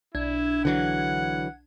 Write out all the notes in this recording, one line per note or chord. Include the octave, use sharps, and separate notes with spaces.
B1 D4 E4 G#6
D3 E3 F#3 F#5